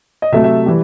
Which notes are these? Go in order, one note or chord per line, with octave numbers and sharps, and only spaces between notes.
D#5
C3 F#3 A3 E5
E5
E3 G3